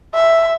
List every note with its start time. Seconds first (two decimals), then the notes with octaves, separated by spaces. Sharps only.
0.15 E5